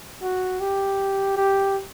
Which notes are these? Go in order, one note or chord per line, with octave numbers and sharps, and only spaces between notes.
F#4
G4
G4